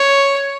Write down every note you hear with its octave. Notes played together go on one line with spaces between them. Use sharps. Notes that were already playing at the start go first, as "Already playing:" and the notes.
Already playing: C#5